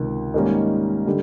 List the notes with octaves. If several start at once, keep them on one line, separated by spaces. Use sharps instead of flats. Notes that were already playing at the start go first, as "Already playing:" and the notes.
Already playing: C#2 C3 D#3
G#2 D#3 G3 A#3 C#4
D3 G3